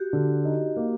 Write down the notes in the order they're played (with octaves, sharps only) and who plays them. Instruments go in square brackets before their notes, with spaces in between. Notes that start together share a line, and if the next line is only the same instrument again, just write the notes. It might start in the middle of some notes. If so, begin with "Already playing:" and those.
Already playing: [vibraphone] F#4 G4
[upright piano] D3
D#4
A#3